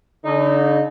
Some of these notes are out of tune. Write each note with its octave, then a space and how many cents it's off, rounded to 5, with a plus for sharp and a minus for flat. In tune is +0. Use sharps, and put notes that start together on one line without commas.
D3 -45 D#4 -20